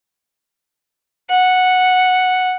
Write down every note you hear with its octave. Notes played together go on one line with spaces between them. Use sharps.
F#5